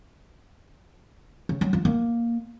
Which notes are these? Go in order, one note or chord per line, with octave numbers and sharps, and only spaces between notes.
C#3
F#3
F3
A#3